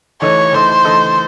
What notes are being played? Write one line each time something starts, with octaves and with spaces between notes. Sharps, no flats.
E3 A3 D#4 A4 C#5 D#5
E3 A3 D#4 A4 C5 D#5
E3 A3 D#4 A4 D#5